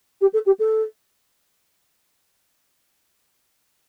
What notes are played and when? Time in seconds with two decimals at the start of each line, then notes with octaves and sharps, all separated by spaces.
0.21 G4
0.33 A4
0.46 G4
0.59 A4